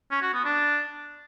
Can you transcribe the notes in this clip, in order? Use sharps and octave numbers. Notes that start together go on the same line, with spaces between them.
C#4
F#4
B3
D4